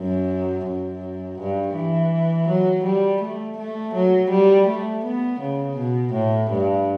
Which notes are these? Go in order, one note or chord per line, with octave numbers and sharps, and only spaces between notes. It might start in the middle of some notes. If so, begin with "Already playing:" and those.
Already playing: F#2
F#2
G2
E3
F#3
G3
A3
A3
F#3
G3
A3
B3
C#3
B2
A2
G2